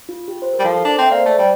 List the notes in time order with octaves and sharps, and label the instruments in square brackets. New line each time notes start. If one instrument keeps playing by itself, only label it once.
[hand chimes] F4
G4
C5
A#4
[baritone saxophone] G3
[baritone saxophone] F3 [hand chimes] A4
[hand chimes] A4
[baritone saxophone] D4 [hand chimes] C5
[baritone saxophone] C4 [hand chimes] E5
[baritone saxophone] A#3 [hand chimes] D5
[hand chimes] C5
[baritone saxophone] A3 [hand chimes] D5
[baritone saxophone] G3 [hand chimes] D5